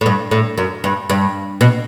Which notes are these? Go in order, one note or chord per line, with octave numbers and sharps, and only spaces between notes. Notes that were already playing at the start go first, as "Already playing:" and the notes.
A2
G2
A2
F#2
G2
G2
B2